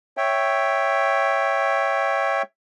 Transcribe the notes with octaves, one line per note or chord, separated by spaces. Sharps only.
C#5 E5 G5